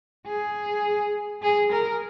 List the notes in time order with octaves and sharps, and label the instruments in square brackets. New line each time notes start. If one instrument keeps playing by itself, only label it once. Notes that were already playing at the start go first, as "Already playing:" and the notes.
[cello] G#4
G#4
A#4